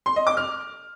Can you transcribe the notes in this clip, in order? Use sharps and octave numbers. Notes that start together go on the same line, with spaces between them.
C6
D#5
D6
F6